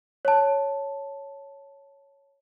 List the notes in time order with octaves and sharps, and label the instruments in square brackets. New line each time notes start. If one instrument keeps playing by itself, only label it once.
[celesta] C#5 A5